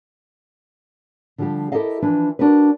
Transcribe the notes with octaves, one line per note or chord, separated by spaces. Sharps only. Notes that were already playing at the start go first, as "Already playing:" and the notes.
D3 F3 G3 F4 G4
E4 G4 A4 A#4 D#5 F5
E3 F3 D4 B4
D4 F#4 A#4 B4